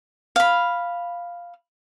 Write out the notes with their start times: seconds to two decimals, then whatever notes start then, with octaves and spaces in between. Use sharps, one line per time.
0.36 F5 B5